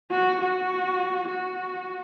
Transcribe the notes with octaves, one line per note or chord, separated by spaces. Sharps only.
F#4
F#4
F#4